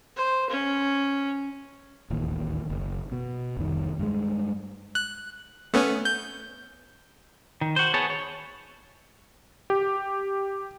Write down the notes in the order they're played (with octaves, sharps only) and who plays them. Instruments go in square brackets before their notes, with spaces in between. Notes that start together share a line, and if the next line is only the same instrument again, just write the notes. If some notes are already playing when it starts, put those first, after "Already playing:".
[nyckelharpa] C5
C#4
[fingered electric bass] D1 A1 D#2
F#1
B2
F1 C2 D#3
G2 G#3
[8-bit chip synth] F#6
A3 B3 C#4
G6
[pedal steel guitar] D#3
F#4 C5
B3 G#4 C#5 A5
C#5
[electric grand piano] G4